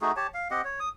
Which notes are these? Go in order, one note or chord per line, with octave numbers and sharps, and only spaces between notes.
A3 D#4 F#4 G#4
G4 C#5 A5
F5
C4 G4 D#5 F#5
C#5
D#6